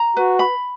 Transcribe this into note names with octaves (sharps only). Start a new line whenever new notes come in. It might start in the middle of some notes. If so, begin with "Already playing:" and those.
Already playing: A#5
F#4 B4
B5